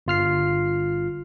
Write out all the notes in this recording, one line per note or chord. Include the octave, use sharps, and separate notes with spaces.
G1 F4 F6 C7